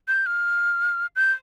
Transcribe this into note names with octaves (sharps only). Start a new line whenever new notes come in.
G6
F6
G6